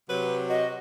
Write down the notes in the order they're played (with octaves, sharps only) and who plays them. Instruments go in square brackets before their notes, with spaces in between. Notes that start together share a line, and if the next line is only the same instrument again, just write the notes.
[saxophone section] C3 F#3 [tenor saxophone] B4
[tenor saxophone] F#4 [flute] D#5